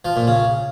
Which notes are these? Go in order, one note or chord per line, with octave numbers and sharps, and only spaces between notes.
F3
A#2
C#3